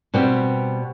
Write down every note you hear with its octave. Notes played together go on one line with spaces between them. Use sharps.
B2 G3 C4 G4